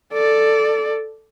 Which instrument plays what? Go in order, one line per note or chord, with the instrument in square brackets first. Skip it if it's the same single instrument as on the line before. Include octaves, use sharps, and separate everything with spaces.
[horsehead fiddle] A4 D5